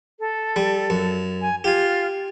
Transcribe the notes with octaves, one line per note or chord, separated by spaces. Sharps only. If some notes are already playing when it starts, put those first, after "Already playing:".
A4
G3
F#2
G#5
F4 G4 G#5